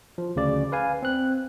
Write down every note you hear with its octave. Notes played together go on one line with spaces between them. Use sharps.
F3
D2 C#3 D5
B4 F5 G#5
C4 F#6